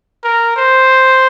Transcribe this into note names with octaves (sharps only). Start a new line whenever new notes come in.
A#4
C5